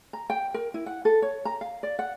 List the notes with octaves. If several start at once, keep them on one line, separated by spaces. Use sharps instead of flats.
A#5
G5
A#4
E4
F#5
A4
C#5
A#5
F5
D5
F#5